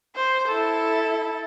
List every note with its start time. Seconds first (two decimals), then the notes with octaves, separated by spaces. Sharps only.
0.16 C5
0.48 E4 A4